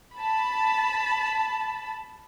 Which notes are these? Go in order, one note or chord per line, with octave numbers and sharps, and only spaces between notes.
A5 B5